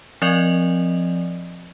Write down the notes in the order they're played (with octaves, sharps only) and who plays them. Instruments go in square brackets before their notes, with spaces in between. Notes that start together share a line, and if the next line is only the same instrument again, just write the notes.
[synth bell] F3 C4 D5 D#5